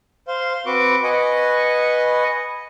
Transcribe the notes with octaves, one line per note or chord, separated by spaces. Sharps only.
C5 F5 C6
C4 F#4 B4 C#6 D6
B4 D#5 F#5 G#5 C#6